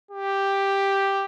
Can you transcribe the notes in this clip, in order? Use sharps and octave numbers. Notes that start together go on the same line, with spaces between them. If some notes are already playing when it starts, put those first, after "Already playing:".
G4